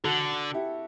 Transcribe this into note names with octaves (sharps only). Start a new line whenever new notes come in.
D3 F#4 A4
E4 G4